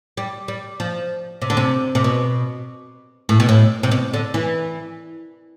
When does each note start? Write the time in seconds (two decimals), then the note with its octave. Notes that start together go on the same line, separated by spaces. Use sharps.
0.17 G3
0.48 G3
0.80 F3
1.42 C3
1.50 D3
1.57 C3
1.95 C3
2.04 B2
3.29 A2
3.40 B2
3.49 A2
3.83 C3
3.91 B2
4.13 D3
4.34 E3